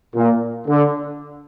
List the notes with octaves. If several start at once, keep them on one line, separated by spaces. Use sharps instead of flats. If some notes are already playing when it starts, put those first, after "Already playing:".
A#2
D3